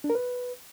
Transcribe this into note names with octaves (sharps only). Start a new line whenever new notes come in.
D4
A#4
B4